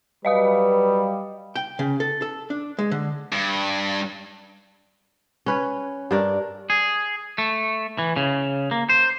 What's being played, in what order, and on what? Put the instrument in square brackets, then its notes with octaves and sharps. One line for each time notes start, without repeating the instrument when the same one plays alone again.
[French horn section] F#3 B4 [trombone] G3 [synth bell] D#5 F5 D#6
[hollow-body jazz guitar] G5
C#3
A4
A4
D4
G#3
D3
[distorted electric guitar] G2
[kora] C#4 B4 C#5
G2 D4 A#4
[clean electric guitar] G#4
A3
E3
C#3
A#3
C5